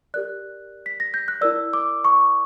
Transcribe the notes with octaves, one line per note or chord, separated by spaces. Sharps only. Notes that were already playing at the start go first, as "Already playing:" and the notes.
G4 A#4 D5 F#6
B6
A#6
G6
F#6
E4 A#4 D5 E6
D6
C#6